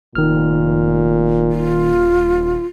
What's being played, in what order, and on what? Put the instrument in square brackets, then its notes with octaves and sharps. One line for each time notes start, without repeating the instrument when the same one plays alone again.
[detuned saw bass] F1 [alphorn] A#2 [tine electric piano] D#3 F6
[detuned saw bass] D#1 [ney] F4